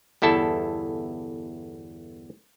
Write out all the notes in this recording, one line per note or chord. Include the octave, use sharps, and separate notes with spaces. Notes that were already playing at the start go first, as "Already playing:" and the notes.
G1 E2 E4 A4 A5